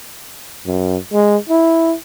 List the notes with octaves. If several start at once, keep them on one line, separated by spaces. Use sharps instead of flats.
F#2
G#3
E4